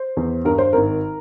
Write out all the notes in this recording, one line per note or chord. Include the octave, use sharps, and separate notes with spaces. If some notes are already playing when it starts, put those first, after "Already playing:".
Already playing: C5
E2
G2 A#4
C5
G#1 A#4